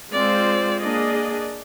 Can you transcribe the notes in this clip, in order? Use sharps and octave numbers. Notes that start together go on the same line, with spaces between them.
G#3 C4 F4 C5 D5
A#3 D4 G#4 D5 D#5